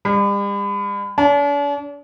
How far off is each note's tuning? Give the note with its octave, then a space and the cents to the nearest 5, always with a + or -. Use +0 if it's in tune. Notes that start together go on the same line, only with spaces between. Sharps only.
G3 +45
D4 -45